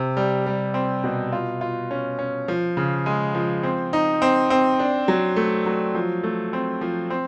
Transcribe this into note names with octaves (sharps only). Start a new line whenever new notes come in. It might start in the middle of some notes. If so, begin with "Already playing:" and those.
Already playing: C3
G3
G3
C4
B2
F4
F4
C#4
C#4
F3
C#3
G#3
F3
C4
D#4
C4
C4
D4
F#3
A3
F#3
F3
A3
C4
F3
C4